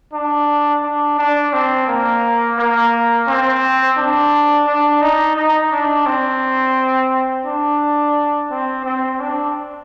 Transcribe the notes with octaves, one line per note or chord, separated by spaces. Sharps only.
D4
D4
D4
C4
A#3
A#3
C4
D4
D4
D#4
D#4
D4
C4
D4
C4
C4
D4